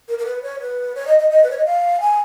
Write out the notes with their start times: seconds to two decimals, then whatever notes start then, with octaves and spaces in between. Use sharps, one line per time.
0.08 A#4
0.19 A#4
0.26 B4
0.43 C#5
0.61 B4
0.95 C#5
1.07 D#5
1.19 D#5
1.30 D#5
1.43 B4
1.51 C#5
1.58 D#5
1.66 F5
2.01 G#5